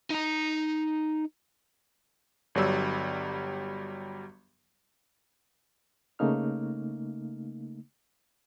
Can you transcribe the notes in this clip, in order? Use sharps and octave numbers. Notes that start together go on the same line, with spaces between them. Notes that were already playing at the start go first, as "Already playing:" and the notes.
D#4 A#5
G1 F#3 G3 E6
C#3 A3 A#3 D#4 F6